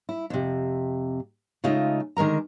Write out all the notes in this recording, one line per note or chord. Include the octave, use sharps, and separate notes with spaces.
E4
F2 C3
C#3 G#3 A3 D#4 F4
D3 D#3 G#3 A#4 A#5